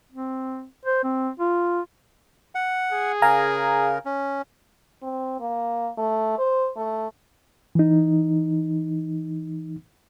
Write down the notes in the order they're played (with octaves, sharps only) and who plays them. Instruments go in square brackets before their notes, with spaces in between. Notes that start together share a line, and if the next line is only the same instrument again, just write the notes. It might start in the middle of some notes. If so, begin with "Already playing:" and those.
[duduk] C4
C5
C4
F4
[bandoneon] F#5
[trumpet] G#4
[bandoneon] C#3 A#4 [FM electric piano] F5 G#5 A#5
[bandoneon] C#4
[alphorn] C4
A#3
A3
C5
A3
[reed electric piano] E3 D#4